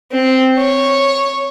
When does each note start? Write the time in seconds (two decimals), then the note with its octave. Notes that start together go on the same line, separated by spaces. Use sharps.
0.12 C4
0.58 C#5